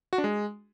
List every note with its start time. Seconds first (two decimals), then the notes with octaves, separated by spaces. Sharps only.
0.13 F#4
0.18 D4
0.24 G#3